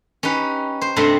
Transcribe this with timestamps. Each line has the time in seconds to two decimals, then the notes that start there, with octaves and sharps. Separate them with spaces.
0.23 C#4 D#4 G4 B4
0.81 C5
0.96 G2 C3 A3 C4 D#5 C6